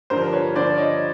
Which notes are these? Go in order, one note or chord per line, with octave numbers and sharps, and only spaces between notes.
G2 D3 F3 A#4 C5
B4 C#5
G2 D3 F3 C5 D5
C#5 D#5